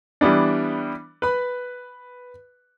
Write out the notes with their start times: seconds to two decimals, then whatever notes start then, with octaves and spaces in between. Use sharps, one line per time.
0.21 E3 G3 B3 D4
1.22 B4 B5